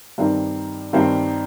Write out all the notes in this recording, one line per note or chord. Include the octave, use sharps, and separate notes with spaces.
G2 D#3 G3 C4 D#4
G2 D#3 G3 C4 D#4